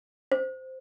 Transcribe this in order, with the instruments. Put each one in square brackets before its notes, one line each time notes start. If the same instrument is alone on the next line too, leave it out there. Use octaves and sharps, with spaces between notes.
[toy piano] C5